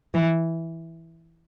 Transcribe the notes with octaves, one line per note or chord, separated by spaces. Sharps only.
E3